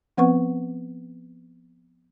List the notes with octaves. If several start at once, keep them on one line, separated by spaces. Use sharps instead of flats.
F3 B3 C4 B4 F#5 C#6